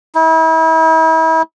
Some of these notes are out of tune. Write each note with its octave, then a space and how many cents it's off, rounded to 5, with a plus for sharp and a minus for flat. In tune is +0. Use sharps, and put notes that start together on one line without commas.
E4 -40